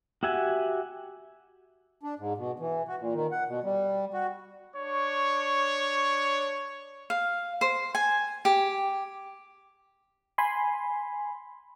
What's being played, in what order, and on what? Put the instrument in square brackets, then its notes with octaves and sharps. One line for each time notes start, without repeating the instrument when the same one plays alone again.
[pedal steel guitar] F#4 G4 E5 F#5 G#5
[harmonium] D4
G#2
B2
E3
F#4
A#2
D#3
F#5
B2
G3
F#4
[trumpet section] D4 C#5 C#6
[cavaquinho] F5
C5
G#5
G4
[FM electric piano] G#5 B5 C6